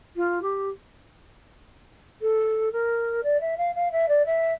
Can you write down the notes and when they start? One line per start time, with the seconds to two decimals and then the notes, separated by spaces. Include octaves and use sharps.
0.15 F4
0.41 G4
2.21 A4
2.72 A#4
3.23 D5
3.40 E5
3.57 F5
3.74 F5
3.91 E5
4.08 D5
4.25 E5